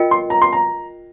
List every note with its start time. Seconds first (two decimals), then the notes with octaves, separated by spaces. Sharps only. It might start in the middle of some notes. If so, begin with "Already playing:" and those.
Already playing: F4 A#4 D#5 G5
0.11 C6
0.30 A#5
0.42 C6
0.53 A#5